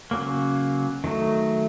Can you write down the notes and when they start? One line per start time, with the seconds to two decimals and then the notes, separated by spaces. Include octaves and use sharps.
0.11 C#3 F#3 A#3
1.04 D#3 F#3 A3